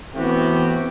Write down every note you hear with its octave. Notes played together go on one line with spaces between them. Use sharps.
E3 A3 B3 C4 F#4 G4